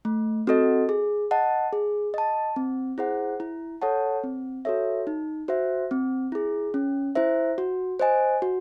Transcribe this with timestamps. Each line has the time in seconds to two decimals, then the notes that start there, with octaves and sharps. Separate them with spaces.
0.05 A3
0.47 C4 F#4 A4 D#5
0.89 G#4
1.31 D#5 F#5 A5
1.73 G#4
2.14 D#5 A5
2.56 C4
2.98 E4 G#4 C5 F#5
3.40 E4
3.81 A4 C#5 F#5 A5
4.24 C4
4.65 F#4 A4 C#5 E5
5.07 D#4
5.48 F#4 C5 E5
5.91 C4
6.32 E4 G#4
6.74 C#4
7.15 E4 C5 E5
7.58 F#4
7.99 C5 D#5 G#5
8.42 F#4